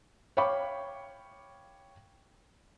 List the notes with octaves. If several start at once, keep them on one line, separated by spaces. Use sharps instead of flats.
C#5 F5 G5 B5 C#6 D6